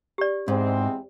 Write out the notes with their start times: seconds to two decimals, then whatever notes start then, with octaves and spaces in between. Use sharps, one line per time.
0.18 G4 D5
0.48 E2 G#2 G#3 C4